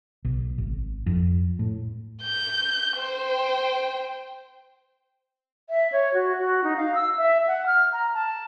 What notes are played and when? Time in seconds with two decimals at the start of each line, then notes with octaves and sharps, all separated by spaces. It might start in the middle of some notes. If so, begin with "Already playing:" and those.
0.25 B1
0.58 G#1
1.06 F2
1.59 A2
2.23 G6
2.97 C5 G5
5.70 E5
5.92 C#5
6.14 F#4
6.39 F#4
6.64 D#4
6.77 F5
6.95 E6
7.18 E5
7.47 F#5
7.66 F6
7.92 A#5
8.14 A5